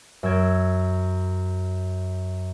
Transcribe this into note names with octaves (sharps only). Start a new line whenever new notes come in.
F#2 E6 G#6 D7